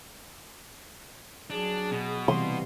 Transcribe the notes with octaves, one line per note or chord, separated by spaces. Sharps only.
F#3 D4 G#4
B2
C3 E3 G3 C6